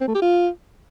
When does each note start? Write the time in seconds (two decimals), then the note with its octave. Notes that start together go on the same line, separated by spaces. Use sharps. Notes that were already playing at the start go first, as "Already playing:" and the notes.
0.01 C4
0.08 A3
0.15 G4
0.22 F4